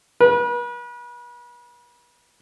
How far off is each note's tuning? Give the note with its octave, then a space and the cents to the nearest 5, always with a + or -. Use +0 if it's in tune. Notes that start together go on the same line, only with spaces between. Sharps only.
B4 -40